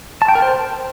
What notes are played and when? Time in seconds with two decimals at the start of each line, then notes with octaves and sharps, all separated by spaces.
0.22 A5
0.29 G5
0.35 A#4
0.42 C5